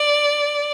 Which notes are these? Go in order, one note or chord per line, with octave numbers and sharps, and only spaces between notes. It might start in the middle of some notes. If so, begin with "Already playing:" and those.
Already playing: D5